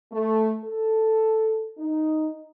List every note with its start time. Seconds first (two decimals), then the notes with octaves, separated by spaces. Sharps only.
0.12 A3
0.65 A4
1.78 D#4